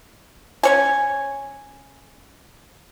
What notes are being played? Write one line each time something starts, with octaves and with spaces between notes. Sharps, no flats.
C#4 C#5 G#5